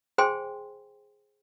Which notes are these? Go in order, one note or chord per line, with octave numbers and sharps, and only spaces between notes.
G#4 C5 G5 G#5 C6